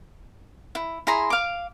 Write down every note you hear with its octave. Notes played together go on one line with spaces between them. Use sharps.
E4
E4 G#4 A#5 C6
F5 D6